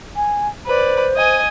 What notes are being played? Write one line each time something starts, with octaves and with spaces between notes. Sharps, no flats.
G#5
B4 C5 D5
D#5 G#5